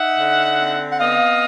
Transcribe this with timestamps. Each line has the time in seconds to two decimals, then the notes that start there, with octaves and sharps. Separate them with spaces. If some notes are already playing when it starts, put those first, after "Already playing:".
Already playing: D#4 E5 F#5
0.18 D3
0.59 C4
0.92 F#5
0.99 B3 D#5 F5